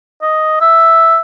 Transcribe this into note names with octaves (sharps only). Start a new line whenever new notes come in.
D#5
E5